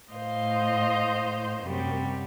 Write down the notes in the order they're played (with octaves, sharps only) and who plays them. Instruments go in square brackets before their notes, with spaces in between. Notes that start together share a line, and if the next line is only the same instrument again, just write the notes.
[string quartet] A2 C5 D#5 F5 G6
F#2 C3 G3